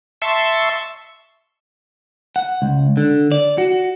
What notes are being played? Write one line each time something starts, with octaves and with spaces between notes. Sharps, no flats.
E5 A5 C6 C#6
F#5
C#2
D3
D5
F#4